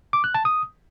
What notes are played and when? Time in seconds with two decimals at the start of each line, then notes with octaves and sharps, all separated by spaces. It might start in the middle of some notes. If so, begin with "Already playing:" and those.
0.13 D6
0.24 F#6
0.34 A5
0.45 D#6